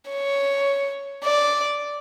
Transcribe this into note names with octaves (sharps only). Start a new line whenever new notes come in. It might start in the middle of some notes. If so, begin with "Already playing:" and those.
C#5
D5